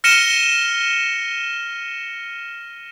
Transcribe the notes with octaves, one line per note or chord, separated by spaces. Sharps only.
F6 A#6 C#7 D#7 E7 G7